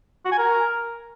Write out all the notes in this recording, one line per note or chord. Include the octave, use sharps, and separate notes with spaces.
F#4
G#5
A#4